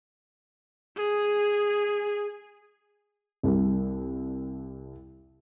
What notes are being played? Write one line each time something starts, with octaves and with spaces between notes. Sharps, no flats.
G#4
C2 G3